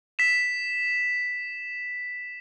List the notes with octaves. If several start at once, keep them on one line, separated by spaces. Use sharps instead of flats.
B6 E7